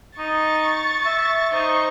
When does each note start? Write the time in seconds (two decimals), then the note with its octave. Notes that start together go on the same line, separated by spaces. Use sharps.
0.18 D#4 C#6 A6
1.06 E5
1.53 D#4 C5 C#6